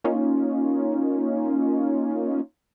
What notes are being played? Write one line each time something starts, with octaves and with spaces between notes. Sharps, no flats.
A#3 C#4 D#4 F4